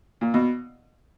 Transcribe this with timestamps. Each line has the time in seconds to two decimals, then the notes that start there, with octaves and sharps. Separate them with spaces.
0.21 A#2
0.34 B2